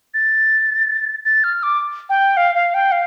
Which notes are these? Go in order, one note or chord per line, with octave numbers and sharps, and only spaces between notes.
A6
A6
F6
D6
G5
F5
F5
G5
F5